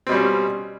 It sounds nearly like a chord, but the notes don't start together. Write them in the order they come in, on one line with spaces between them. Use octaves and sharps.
C4 B2 G3 C#4